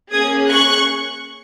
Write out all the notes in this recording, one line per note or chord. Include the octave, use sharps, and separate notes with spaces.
A#3 C#4 G#4 D#6 G#6
C#6 F#6